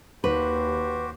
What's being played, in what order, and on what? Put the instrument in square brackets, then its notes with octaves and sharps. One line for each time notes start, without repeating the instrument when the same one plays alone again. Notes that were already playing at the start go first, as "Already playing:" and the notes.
[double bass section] D#2 [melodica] F#4 G4 C5 [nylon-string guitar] B4